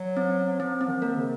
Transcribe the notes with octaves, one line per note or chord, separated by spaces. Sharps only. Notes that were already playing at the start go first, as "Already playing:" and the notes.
Already playing: F#3
C4
F3 C4
C4
D#3
A#3 A#4
C#3